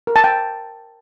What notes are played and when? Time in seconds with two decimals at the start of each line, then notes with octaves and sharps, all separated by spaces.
0.07 A#4
0.16 A5
0.24 G5